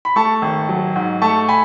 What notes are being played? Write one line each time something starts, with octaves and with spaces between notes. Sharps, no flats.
B5
A3 A5 C#6
G#1
F#3
G#2
A3 A5 C#6
G#5 B5